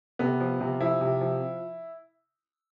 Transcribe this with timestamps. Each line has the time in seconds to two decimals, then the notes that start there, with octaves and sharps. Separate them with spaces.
0.19 C3 B3
0.40 F3
0.60 C3
0.80 F3 E4
1.01 C3
1.21 F3